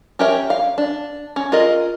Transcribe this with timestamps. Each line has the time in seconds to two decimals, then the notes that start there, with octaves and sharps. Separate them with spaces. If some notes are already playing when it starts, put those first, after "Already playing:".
0.19 C#4 G4 A#4 C#5 E5
0.50 F5
0.78 D4
1.36 C#4
1.52 F4 G#4 A#4 D#5